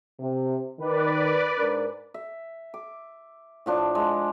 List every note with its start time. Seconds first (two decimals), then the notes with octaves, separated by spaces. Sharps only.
0.19 C3
0.79 D#3 B4 D5
1.57 G#2 D4 A#4
2.14 E5
2.74 D6
3.66 A2 F3 D4
3.95 G#3